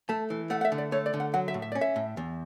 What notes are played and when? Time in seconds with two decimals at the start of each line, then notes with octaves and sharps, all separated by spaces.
0.09 A3 A5
0.30 E3
0.50 A3 F#5
0.61 F#5
0.65 E5
0.72 D3
0.78 D5
0.92 A3 C#5
1.06 D5
1.14 D3
1.20 F#5
1.34 F#3 F#5
1.48 E5
1.54 A2
1.62 E5
1.72 C#4 D5
1.81 E5
1.96 A2
2.17 E2